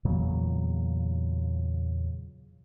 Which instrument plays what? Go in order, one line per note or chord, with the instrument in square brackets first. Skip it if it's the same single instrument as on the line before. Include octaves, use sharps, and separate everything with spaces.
[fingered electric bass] E2 A#2 C#3 F#3